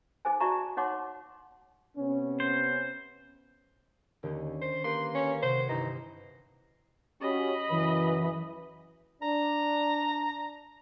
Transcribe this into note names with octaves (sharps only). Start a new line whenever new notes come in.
D#4 G#4 C5 G#5
F#4 D5 E5 A5 A#5 C#6
D#4 C#5 F#5 C6 D6
C3 B3 C#4
C5
D#2 D3 D#3 C#4
C5
A#3 G4 B4 C6
C#4
C3 C5 F#5 G#6
G1 E3 D#4
C#4 F#4 G4 D#5 B5
F#2 C#3 E3 B4
D4 A#5